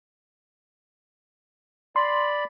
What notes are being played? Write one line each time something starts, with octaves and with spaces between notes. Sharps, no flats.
D5 B5 C6